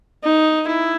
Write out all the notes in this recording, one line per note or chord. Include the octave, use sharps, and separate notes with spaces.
D#4
E4